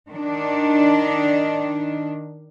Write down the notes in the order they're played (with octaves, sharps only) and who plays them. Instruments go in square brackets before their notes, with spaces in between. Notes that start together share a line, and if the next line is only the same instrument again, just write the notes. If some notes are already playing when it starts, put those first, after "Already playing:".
[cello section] D#3 D4